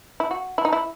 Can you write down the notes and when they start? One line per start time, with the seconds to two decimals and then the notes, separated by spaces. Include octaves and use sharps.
0.20 E4
0.31 F#4
0.58 E4
0.65 D#4
0.73 E4